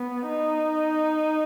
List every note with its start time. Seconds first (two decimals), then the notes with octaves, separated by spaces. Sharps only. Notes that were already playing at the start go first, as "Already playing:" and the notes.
Already playing: B3
0.28 D#4